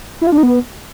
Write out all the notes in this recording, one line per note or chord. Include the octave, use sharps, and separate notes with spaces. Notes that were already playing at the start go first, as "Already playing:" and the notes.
E4
F4
D4
D#4
B3